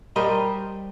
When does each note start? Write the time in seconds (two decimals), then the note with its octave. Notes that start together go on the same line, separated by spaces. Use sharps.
0.16 G3 G4 A#4 C5 D#5